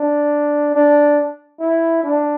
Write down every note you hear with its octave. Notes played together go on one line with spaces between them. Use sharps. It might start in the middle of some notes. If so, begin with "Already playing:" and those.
Already playing: D4
D4
E4
D4